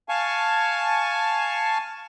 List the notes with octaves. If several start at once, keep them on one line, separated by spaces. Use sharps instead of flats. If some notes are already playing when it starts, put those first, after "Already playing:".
F5 G#5 A5 C#6